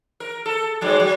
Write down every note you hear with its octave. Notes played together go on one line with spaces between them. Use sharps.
A#4
A4
G#2 F#3 G#3
F#3